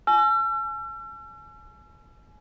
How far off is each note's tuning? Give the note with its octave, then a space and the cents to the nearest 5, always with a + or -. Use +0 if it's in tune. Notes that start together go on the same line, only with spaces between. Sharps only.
G#5 +35 E6 +45